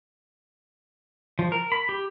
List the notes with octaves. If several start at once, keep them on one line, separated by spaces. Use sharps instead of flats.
F3
A#4
B5
G4